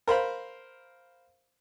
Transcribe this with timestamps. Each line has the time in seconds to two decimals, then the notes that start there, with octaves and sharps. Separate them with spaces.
0.07 A#4 C5 F5 B5